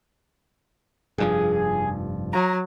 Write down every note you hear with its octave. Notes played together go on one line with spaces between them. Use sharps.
F1 G2 F3 G#4
F#3 A#5